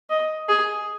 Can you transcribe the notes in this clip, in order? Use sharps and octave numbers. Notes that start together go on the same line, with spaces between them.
D#5
G#4